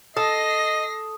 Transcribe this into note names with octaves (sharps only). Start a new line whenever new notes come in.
A4 D#5 D#6 A#6 C7